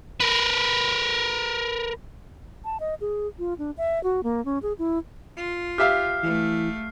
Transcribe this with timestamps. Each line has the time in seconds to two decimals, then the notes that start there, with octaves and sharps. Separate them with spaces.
0.20 A#4 B4
2.65 A5
2.80 D#5
3.01 G#4
3.39 F4
3.59 D4
3.77 E5
4.04 F#4
4.23 A#3
4.45 C#4
4.62 G#4
4.79 E4
5.37 F4
5.78 G4 E5 F5 F6 C7
6.23 E3 A3